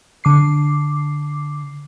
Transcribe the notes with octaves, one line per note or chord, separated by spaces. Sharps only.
D3 D6 C7